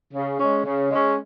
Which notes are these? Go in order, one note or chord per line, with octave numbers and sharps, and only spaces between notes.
C#3
G#3 C#4
C#3
G#3 C#4